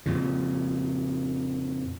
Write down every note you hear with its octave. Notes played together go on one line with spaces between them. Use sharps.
F2 A#2 C#3